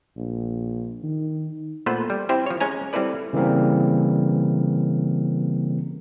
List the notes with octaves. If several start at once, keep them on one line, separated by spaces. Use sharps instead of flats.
A#1
D#3
A#2 A3 B3 B4 C5
G3
C4 E4 G4 C5
F3 C#5
G#3 C#4 G#5 A#5
G3 C4 E4 A4 B4 D5
C#3 E3 G3 A#3 C4 A#4